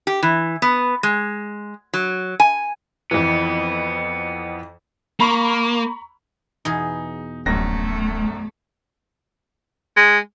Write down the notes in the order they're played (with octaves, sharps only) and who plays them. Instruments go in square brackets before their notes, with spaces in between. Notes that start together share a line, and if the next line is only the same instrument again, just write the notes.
[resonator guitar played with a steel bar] G4
E3
B3
G#3
F#3
G#5
[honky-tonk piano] F2 E3 [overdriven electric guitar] B3
[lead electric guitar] A#3 [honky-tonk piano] A#5 B5 C#6
[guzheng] E2 B2 G#4 [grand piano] D#4
[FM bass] D1 [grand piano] A#1 F#2 A#6 [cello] A3
[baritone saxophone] G#3